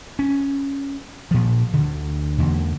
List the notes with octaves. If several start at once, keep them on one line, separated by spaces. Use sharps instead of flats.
C#4
A#2 F3
D2 D3
E2 D3 A#3